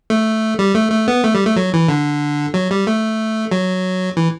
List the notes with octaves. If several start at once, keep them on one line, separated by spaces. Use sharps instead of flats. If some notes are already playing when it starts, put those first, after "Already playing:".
A3
G3
A3
A3
B3
A3
G3
A3
F#3
E3
D3
F#3
G3
A3
F#3
E3